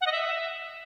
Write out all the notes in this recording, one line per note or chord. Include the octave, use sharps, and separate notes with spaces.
F#5
D#5
E5